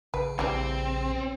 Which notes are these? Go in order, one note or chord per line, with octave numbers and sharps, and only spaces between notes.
A1 C#3 B4
A#1 E3 G3 C4